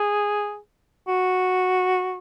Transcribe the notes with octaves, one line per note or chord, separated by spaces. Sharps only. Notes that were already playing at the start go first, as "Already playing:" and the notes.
Already playing: G#4
F#4